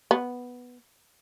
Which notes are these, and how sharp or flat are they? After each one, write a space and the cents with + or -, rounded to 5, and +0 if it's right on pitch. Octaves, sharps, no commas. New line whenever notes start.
B3 +0